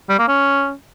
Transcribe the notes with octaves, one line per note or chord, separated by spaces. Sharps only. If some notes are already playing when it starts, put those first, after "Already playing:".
G3
A#3
C#4